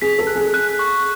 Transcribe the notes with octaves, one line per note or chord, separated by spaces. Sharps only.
G#4 B6
A4
F#6
G#4
F#6
C#6